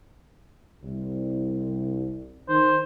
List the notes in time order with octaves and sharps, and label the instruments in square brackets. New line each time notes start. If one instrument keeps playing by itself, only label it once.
[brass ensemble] C2
[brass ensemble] D#3 [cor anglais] C5